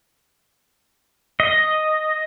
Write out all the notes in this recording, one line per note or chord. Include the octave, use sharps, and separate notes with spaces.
D#5